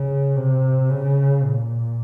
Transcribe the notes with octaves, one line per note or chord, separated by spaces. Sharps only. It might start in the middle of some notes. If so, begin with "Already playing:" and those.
Already playing: C#3
C3
C#3
A#2